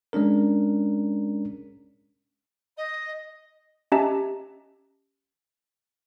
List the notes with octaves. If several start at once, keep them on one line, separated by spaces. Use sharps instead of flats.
G#3 C#4 D4 A#4
D#5
C#4 G4 D#5 E5 A5 A#5